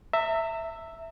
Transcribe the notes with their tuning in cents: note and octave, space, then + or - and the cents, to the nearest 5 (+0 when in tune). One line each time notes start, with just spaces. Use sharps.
E5 +0 A#5 -40